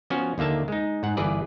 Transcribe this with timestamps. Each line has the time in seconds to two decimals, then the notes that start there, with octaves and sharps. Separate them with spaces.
0.10 F3 B3 C#4 F#4
0.38 D#2 D3 A#3 E5 A5
0.68 G#3 D#4
1.03 G#2 F#5
1.17 G1 E3 G#4 B4 D5